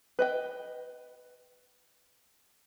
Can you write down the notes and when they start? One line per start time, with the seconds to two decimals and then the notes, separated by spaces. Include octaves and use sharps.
0.19 B4 D#5 G5